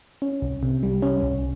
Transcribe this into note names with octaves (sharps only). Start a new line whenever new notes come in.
C#4
C2
C3
G3
C#4
C2